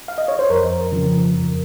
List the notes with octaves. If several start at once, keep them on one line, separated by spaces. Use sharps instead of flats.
F5
D#5
C#5
C5
F2 A#4
C#3 F3
F2